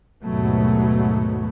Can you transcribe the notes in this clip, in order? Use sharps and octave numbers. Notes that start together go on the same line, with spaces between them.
D#2 G#2 B2 F#3 A3 B3